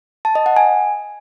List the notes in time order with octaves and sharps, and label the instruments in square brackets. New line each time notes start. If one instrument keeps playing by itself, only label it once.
[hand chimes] A5
D#5
F#5
G#5